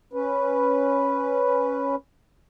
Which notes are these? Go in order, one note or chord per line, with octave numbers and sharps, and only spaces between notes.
C#4 B4